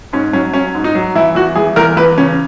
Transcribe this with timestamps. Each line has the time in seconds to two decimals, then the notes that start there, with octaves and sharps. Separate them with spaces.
0.13 G#2 C#4
0.33 F#3 C#4
0.53 F#3 C#4
0.74 G#2
0.84 D#4
0.95 F#3
1.15 E3 E4
1.35 E2 F#4
1.55 E3 G#4
1.76 E2 A#4
1.97 E2 B4
2.18 C#3 C#4